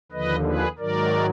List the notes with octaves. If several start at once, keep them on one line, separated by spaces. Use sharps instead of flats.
D#2 D3 F3 B4 D#5
G#4 B4
G#2 D#3 F#3 A#4 D5